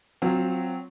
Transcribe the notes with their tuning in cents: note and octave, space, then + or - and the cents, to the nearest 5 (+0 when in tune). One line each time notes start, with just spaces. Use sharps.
F#3 +0 C4 +0 F4 +20